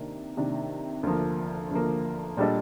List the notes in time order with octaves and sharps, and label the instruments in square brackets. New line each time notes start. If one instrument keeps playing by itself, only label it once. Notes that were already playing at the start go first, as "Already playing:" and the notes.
Already playing: [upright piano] C3 D#3 A#3 D4
C3 D#3 A#3 D4
D2 D3 F3 A#3
D2 D3 F3 A#3
A#2 G3 D4 A4 D#5